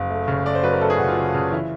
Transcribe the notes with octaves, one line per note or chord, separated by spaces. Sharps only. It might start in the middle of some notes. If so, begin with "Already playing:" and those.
Already playing: F#1
A3
C#3
A3 D5
C5
F#3 B4
A#4
A3 A4
G#4
C#3 F#4
F4
C#3
C#3
E3 E4